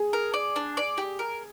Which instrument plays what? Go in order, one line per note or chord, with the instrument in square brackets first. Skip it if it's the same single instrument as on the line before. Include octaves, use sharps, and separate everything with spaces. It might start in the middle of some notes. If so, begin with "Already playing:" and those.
Already playing: [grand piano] G#4
[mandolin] A#4
D5
D4
D5
G4
A#4